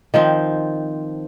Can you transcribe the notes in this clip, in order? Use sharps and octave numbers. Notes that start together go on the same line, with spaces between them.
D#3 F3 C4